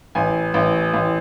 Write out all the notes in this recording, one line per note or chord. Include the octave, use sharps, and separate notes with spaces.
A1 G#5
A1
A1